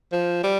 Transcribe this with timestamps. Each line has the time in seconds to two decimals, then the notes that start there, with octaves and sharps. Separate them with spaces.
0.12 F3
0.44 G3